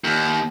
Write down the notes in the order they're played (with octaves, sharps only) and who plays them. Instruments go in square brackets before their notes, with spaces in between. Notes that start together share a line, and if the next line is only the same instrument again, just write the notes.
[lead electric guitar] D#2